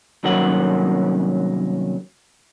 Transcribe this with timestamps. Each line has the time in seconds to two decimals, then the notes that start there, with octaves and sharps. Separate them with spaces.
0.24 C2 D#3 F#3 A#3 C#4 F#5